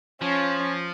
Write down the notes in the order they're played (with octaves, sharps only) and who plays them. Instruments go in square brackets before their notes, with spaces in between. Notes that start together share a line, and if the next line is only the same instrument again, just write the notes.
[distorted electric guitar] F3 [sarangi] C#4